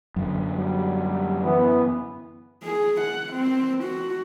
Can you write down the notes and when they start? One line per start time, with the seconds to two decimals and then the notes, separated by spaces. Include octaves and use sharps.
0.16 F#2 D3
0.56 F#3 G3
1.43 E3 B3
2.63 G#4
3.00 F#5
3.33 C4
3.83 F#4